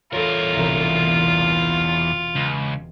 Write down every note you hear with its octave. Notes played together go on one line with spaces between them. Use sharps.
E2 F4 A4 A#4 C#5
E1 C2 E3
C#6
C#2